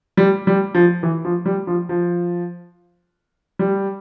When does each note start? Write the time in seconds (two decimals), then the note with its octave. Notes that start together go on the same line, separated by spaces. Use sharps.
0.17 G3
0.47 G3
0.75 F3
1.03 E3
1.25 F3
1.46 G3
1.67 F3
1.89 F3
3.59 G3